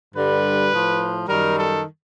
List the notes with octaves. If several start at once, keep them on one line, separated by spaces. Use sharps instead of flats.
G2 D3 G3 B4
A2 F3
F#2 D#3 G3 A#4
A4